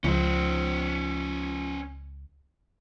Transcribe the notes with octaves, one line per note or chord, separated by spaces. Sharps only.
C#2 F3 C#4 C5